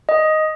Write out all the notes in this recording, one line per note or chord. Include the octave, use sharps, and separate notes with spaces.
D#5